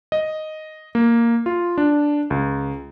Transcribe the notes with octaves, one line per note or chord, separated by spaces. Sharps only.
D#5
A#3
F4
D4
C#2